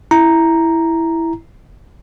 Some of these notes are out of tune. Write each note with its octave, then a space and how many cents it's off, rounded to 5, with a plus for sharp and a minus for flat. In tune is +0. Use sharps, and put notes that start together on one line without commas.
E4 +0 A#5 +0